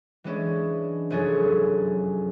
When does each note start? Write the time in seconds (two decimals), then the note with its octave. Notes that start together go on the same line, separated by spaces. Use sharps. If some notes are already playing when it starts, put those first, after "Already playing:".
0.24 E3 G#3 C#4 D4
1.10 F1 F#2 C#4 G#4 A4 C#5